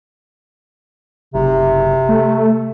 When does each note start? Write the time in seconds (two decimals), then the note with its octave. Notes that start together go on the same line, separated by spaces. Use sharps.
1.34 F#1 C3
2.09 A3